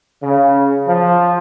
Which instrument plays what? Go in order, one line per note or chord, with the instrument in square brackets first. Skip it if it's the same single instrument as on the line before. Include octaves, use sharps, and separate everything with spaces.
[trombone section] C#3
F3